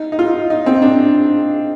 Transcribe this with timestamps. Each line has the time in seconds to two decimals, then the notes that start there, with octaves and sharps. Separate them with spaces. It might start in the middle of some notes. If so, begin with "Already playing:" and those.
Already playing: D#4
0.12 D#4
0.19 F4
0.50 D#4
0.66 C4
0.82 D4